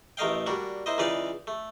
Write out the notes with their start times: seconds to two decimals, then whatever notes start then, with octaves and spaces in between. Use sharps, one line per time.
0.17 A1 A3 A#4 D#5 F5 G5
0.46 G3 A#3 D4 F#4
0.86 A#3 E4 C5 D#5
0.98 C#2 E3 D#4 B4 D5 F5
1.47 A3